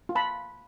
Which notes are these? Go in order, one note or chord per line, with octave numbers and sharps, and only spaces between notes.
F4
A5 B5